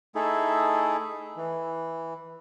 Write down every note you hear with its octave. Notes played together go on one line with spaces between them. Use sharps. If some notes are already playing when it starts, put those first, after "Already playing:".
A3 D#4 E4 G#4 A4
E3